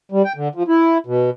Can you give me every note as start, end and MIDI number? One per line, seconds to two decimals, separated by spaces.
0.12 0.22 55
0.25 0.33 79
0.36 0.48 50
0.55 0.63 53
0.68 0.98 64
1.06 1.30 47